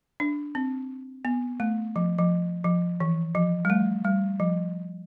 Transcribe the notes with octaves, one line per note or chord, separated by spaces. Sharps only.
D4
C4
B3
A3
F3
F3
F3
E3
F3
G3
A3
G3
F3